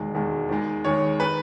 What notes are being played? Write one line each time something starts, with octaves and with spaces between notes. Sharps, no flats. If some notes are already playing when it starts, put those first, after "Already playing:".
Already playing: E1 D#2 D#3 G#3
E1 D#2 D#3 G#3
D#2 D#3 G#3
D#2 D#3 G#3 C#5
D#3 B4